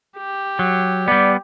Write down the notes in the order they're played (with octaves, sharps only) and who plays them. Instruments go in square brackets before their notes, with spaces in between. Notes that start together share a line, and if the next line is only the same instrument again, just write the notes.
[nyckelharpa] G4
[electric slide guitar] F#3
[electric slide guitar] G3 B3 [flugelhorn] D5